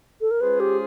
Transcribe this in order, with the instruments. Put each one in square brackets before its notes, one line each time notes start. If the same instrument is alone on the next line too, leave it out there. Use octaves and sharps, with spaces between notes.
[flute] A4
A#4
[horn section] G#3 C#4 F4 G#4 C5 [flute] B4
[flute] G4